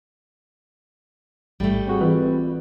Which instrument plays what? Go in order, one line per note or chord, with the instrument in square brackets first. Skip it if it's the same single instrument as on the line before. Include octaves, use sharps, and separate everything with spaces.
[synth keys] A1 G#2 [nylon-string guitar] G3 A3
[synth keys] C4 F#4 G#4
[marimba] E3 [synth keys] C4 F4 B4